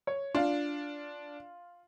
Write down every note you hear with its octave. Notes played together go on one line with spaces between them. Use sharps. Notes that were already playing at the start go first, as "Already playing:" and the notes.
C#5
D4 F4 F5